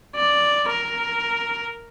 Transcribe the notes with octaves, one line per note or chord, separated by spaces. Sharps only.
D5
A#4